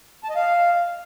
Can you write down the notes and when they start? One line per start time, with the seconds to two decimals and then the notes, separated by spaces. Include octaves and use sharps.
0.24 A5
0.30 D#5
0.36 F5